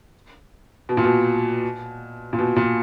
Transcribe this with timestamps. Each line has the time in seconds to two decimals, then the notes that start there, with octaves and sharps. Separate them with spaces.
0.89 B2
0.97 A#2
1.04 B2
2.33 A#2
2.39 B2
2.56 A#2